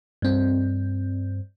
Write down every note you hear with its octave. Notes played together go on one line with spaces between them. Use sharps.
G2 C4